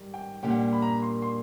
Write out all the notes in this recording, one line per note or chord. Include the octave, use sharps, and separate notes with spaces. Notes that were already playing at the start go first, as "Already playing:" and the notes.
Already playing: G#2 D#3 G3
G5
A#2 G3 A#3 D4 G5
F#5
G5
B5
A#5
C6
C6